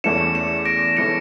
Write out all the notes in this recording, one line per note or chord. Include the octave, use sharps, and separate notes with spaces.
E2 E3 A3 C#4 C#7 E7
C#7 E7
C#7
A#6 D7
E3 A3 C#4 C#7 E7